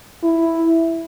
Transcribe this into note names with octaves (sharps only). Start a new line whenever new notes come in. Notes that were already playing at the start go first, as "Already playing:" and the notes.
E4